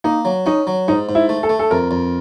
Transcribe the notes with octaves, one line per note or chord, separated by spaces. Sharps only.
A#3 D#4
F#3
C#4 D#4
F#3
G#2 D#4
G#2
E4
A3
A4
A3
A4
F2 A#4
F2